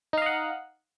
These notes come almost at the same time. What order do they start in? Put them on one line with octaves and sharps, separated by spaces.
D#4 F5 D#5 F#5